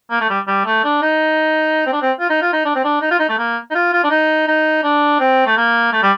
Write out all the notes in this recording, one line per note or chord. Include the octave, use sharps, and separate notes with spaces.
A#3
A3
G3
G3
A3
D4
D#4
C4
D4
C4
F4
D#4
F4
D#4
D4
C4
D4
D#4
F4
D#4
A3
A#3
D#4
F4
F4
D4
D#4
D#4
D4
C4
A3
A#3
A3
G3